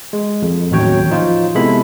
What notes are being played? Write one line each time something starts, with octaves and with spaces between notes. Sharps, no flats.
G#3
F2
A1 D#2 F#3 C#5 G5
F3 D#4 F4
C3 G#3 B3 E4 A4 B5